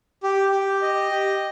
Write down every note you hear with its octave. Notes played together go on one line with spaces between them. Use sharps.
G4
G4
D#5
G4